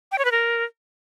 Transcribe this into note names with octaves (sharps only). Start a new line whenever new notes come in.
G5
C#5
B4
A#4